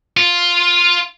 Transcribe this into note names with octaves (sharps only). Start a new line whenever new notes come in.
F4